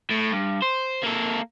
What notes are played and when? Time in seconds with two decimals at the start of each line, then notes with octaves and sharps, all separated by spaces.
0.10 A2
0.31 G2
0.62 C5
1.04 A#3 A4